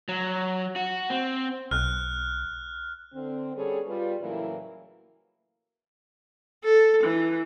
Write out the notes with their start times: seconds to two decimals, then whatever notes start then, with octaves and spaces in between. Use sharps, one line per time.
0.08 F#3
0.76 F#4
1.10 C4
1.71 B1 F6 F#6
3.14 D3 C4
3.55 G3 B3 C#4 G#4 A4 C#5
3.87 G3 F4 B4
4.21 A2 C#3 E3 F#3 A#3 E4
6.64 A4
7.03 E3